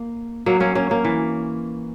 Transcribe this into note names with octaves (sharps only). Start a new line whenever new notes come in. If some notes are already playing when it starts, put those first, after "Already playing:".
Already playing: A#3
F#3 A#3
A#3 C#4
A#3 C#4
A#3 C#4
E3